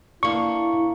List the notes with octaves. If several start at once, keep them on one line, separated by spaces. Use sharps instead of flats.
A#3 D4 E4 C#6